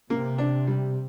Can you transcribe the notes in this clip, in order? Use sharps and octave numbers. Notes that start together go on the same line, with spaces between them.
C3 A#3
D4
G3